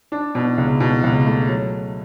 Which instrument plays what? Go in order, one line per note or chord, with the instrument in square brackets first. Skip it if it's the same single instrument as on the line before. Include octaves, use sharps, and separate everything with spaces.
[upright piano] D4
B2
C#2
B2
C#2
A3
F#3